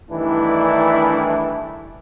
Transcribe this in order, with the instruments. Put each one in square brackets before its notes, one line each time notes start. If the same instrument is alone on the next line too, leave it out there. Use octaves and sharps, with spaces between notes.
[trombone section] G2 D#3 E3 A3 D4 E4